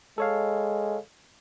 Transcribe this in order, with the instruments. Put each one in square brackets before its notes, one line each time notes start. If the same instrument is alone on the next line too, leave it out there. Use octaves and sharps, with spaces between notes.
[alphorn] G#3 [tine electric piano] A4 C#5 F5